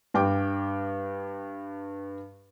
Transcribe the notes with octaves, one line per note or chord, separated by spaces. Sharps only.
G2 G5 D6